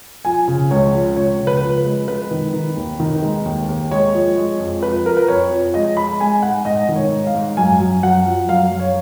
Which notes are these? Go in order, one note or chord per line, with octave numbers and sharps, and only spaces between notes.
F3 G#5
C#3
C#2 C#5
F3
C#2 C#5
C#3
B4
F3
B4
G#3
G#3 B4
D#3
D#3
D#2
D#3
G#3
D#2
D#2
G#3 C#5
F3
G#3
F2
F3 B4
F3 A#4
B4
F2 C#5
F3
G#3 D#5
G#3 B5
G#3 G#5
G#2 F#5
G#2 D#5
D#3
C#5
G#2
F5
G#2
F#2 G#5
F#2
F#2 F#5
F3
F#2 F5
F#2
C#5